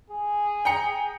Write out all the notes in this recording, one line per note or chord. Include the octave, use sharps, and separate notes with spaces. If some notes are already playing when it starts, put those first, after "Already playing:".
G#4
G5 A#5 C#7